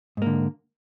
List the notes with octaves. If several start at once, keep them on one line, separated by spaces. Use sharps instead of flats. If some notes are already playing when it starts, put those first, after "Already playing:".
G#2 D3 A#3